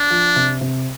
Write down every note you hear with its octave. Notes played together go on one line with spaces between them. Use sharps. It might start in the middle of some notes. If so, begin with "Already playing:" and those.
Already playing: D4
F3
C3
C3